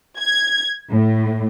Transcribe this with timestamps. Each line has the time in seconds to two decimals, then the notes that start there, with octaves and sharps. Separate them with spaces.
0.19 G#6
0.90 A2